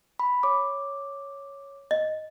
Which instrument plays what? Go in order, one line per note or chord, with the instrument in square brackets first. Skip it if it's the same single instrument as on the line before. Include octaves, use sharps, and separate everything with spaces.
[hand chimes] B5
C#5 D6
[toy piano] D#5